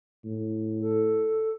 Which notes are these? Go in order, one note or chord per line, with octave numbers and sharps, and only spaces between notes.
A2
A4